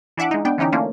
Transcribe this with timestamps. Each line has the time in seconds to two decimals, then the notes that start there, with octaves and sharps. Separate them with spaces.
0.17 E3 D4 E5 F#5 D6
0.31 G#3 D#4
0.45 B3 D4 G5
0.58 D3 E3 C#4 D#4 G4
0.72 A3 A#3 C#4 D4 F4